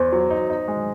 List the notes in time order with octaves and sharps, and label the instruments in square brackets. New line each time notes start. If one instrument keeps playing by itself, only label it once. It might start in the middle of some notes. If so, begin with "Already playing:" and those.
Already playing: [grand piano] E2 [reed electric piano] C5
[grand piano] F#3
D#4
D#4
G#3